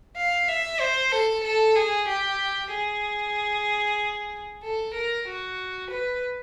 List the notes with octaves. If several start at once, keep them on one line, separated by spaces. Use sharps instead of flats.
F5
E5
C5
A4
A4
G#4
G4
G#4
A4
A#4
F#4
B4